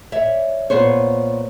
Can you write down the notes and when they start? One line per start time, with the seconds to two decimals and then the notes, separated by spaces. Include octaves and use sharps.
0.12 C#5 D5 E5
0.70 A#2 B3 C5 C#5